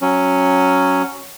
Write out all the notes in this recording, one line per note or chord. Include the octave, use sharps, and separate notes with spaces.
F#3 C#4